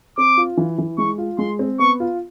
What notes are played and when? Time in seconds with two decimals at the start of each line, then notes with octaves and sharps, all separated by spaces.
0.18 C4 D6
0.37 F4
0.57 E3
0.78 E3
0.98 G#3 C#6
1.18 F4
1.38 G#3 C6
1.59 C4
1.79 B3 C#6
2.00 F4